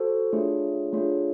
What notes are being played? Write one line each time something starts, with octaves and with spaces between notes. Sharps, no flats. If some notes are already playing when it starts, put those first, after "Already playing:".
Already playing: F#4 A4 C5
A3 D4 F4 G#4 C#5
A3 D4 F4 G#4 C#5